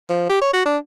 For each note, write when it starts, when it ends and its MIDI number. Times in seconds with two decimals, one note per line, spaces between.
0.09 0.25 53
0.29 0.40 67
0.41 0.50 73
0.53 0.63 66
0.66 0.77 62